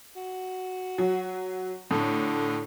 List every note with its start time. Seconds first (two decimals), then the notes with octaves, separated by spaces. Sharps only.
0.16 F#4
0.98 F#3
1.91 A2 D3